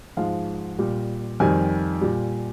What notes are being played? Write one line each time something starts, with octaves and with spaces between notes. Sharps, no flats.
G#2 F3 G#3 F5
A#2 G3
F2 D#3 G3 G#5
A#2 G3